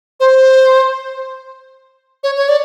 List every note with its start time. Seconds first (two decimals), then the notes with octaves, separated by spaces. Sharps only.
0.20 C5
2.24 C#5
2.37 C#5
2.49 D5